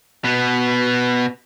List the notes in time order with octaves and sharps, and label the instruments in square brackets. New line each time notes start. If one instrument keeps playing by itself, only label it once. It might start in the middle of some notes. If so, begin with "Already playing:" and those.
[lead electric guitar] B2 B3